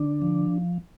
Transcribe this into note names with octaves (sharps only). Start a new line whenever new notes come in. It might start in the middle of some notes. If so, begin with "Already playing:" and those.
Already playing: D3 D4
F3